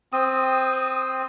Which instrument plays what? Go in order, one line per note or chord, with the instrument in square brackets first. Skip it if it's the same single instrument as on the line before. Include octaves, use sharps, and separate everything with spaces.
[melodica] C4 [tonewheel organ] D#6